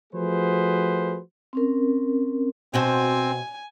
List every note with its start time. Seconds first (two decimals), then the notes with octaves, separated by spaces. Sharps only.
0.14 F3 A3 F#4 G#4 B4 C5
1.53 C4 C#4 A#4
2.74 B2 C4 F#4 C5 G#5